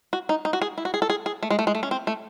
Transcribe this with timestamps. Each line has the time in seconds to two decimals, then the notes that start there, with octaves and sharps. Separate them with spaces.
0.13 F#4
0.29 D#4
0.45 D#4
0.53 F#4
0.62 G#4
0.78 E4
0.85 F#4
0.94 G#4
1.02 A4
1.10 G#4
1.26 G#4
1.43 A3
1.50 G#3
1.59 A3
1.67 G#3
1.75 A3
1.83 C#4
1.91 C4
2.07 A3